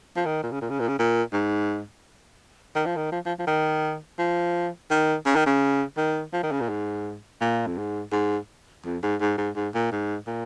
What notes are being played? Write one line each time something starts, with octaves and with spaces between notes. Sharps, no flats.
F3
D#3
A#2
C#3
A#2
C#3
A#2
C#3
A#2
G#2
D#3
F3
D#3
F3
F3
F3
D#3
F3
D#3
C#3
D#3
C#3
D#3
F3
D#3
C#3
A#2
G#2
A#2
F2
G#2
G#2
F2
G#2
G#2
G#2
G#2
A#2
G#2
A#2